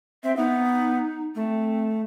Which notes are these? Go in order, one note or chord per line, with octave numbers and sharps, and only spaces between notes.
C4 E5
B3 D#4
A3 C4